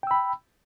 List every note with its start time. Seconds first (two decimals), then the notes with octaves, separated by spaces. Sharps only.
0.03 G5
0.07 E6
0.11 B5